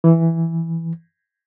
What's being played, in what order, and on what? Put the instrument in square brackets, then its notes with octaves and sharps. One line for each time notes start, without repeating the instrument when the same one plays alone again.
[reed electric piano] E3